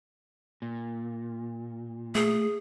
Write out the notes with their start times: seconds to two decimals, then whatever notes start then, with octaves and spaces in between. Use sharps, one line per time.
0.62 A#2
2.15 A3 G#4